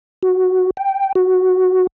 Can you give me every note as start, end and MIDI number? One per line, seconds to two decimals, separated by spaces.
0.23 0.70 66
0.77 1.13 79
1.15 1.87 66